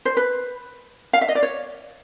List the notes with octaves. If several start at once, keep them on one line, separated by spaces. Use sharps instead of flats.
C5
B4
F5
E5
D#5
D5
C#5